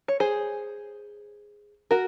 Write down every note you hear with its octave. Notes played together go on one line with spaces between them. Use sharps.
C#5
G#4 C5
F#4 A#4